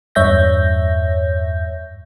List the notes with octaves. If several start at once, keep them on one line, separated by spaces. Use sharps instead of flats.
E2 G2 C#5 E5 G6 A#6